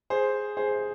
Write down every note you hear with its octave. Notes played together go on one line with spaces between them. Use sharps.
G#4 C5
G#4 C5